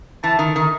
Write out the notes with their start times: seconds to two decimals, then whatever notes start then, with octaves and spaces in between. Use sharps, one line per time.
0.24 E3 A5
0.39 D#3
0.56 D#3